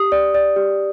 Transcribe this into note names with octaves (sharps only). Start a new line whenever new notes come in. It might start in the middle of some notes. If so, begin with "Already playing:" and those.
Already playing: G4 D#6
D5
D5
G4